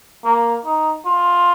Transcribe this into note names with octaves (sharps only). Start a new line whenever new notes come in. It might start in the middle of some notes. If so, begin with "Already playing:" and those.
A#3
D#4
F4